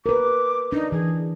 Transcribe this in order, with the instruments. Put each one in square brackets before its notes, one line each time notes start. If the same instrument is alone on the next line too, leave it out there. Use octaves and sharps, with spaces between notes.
[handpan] A#4 B4 [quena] D6
[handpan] D4 [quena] D#4
[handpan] E3 [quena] G#4